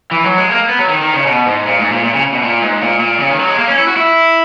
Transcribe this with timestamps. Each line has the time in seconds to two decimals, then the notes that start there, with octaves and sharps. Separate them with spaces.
0.11 E3
0.25 F#3
0.38 G#3
0.51 A#3
0.69 B3
0.79 F#3
0.89 D#3
1.02 D#3
1.14 C#3
1.27 B2
1.46 G#2
1.66 A#2
1.79 G#2
1.91 A#2
2.04 A#2
2.14 C#3
2.33 B2
2.42 A#2
2.62 G#2
2.81 A#2
3.00 A#2
3.19 C#3
3.30 D#3
3.39 F#3
3.48 G#3
3.58 A#3
3.68 C#4
3.78 E4
3.88 F#4
3.97 E4